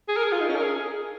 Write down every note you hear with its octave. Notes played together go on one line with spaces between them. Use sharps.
G#4
A#4
G#4
F4
D#4
C#4
A#4
G#4